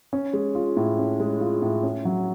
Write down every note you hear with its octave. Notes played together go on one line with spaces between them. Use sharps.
C#4
G#3
F4
A2
C#4
G#3
F4
A2
C#4
F#3